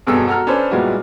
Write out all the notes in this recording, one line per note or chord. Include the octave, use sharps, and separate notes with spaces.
E1 G2 B2 G#4 A4 E6
F#4 A4 A#5 F6
C#4 D4 A4 B4 C5
A#2 G3 G#3 B3 E4 F#4